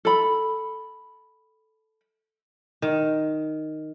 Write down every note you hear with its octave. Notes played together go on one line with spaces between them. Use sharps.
A4 B5
D#3